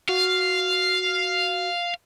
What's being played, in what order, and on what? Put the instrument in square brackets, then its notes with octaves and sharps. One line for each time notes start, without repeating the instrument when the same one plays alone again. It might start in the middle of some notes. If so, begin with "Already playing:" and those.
[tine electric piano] F#4 [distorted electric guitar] F5